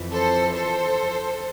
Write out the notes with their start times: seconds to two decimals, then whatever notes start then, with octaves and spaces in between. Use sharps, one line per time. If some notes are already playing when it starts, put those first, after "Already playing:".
Already playing: F2 E3
0.12 A4 C5
0.54 A4 C5